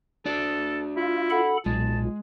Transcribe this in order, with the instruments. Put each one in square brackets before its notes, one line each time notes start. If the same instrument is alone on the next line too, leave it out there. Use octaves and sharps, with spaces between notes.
[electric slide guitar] D4 F#4 D5 [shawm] A4
[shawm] E4 [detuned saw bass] F4
[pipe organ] A4 F#5 B5
[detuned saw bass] B1 [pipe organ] A#2 [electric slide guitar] G#3 [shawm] A5